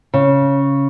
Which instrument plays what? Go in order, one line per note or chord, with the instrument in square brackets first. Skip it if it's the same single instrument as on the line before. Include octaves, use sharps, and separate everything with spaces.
[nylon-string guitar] C#3